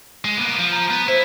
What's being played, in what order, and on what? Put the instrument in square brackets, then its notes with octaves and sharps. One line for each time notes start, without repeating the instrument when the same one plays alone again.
[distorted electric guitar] G#3
A#3 B3
F3
[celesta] A#5
[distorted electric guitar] B3
[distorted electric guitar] E4 [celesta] C5